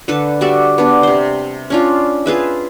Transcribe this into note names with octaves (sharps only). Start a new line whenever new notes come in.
D3 A4 B4
G3 F#4 D5 E5
B3 D4
C3 C5
C#4 D4 F4
F4 G#4 B4 E5